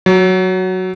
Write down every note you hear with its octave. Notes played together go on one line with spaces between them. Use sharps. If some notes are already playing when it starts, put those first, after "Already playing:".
F#3